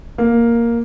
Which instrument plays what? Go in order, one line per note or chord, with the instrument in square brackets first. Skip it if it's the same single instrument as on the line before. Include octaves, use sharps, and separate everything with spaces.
[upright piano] A#3